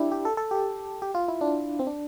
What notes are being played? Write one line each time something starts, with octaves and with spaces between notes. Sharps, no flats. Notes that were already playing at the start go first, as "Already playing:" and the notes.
Already playing: D4 E4 G4
G4
A4
A4
G4
G4
F4
E4
D4
C4
D4